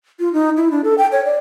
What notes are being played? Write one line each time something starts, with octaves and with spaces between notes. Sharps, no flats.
F4
D#4
E4
D4
A4
G5
C#5
D5